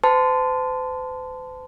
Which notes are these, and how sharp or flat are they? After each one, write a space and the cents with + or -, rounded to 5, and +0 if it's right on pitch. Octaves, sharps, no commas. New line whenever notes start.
C5 -45 A5 +0 C6 -30